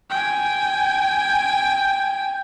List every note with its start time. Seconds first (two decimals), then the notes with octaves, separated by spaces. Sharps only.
0.10 G5 G#5